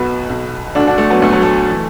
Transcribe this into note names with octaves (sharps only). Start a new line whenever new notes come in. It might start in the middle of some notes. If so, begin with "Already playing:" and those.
Already playing: B1 B2 F#4 B4
B1 B2
D2 D3 D4 F#4
D4 F#4
A3
F#3 B3
D2 D3 A3
F#3
A3
E3